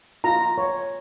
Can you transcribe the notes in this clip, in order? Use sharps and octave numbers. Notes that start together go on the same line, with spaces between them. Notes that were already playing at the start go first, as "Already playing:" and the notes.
F4 A#5
C#5